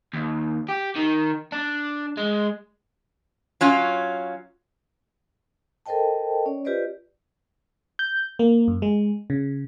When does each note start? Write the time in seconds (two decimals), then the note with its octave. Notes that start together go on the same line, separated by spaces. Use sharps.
0.13 D#2
0.69 G4
0.96 D#3
1.52 D4
2.17 G#3
3.61 F#3 C#4 F4
5.86 A4 A#4 C5 D#5 G5 A5
6.46 C#4 C#5 D5
6.65 F4 G4 B4 C5 D5 D#5
7.99 G6
8.39 A#3
8.68 F#2
8.82 G#3
9.30 C#3